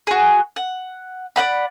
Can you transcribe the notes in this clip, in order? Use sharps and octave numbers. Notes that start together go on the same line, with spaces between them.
F#4 G#4
F#5
D5 D#5 F#5 B5